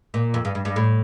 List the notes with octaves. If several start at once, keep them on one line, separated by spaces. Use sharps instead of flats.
A#2
F2
G2
G2
G2
A2